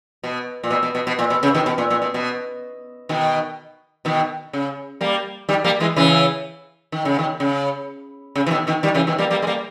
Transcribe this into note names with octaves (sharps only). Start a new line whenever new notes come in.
B2
A#2
B2
B2
B2
B2
A#2
B2
C#3
B2 D#3
B2
A#2
A#2
B2
B2
B2 D#3
B2 D#3
C#3
G3 A#3
D#3 G3
G3 A#3
E3 G#3
C#3 E3
D#3
C#3
B2 D#3
C#3
C#3
E3
B2 D#3
B2 D#3
D#3 G3
C#3 E3
B2 D#3
G3 A#3
G3 A#3
G#3
G3 A#3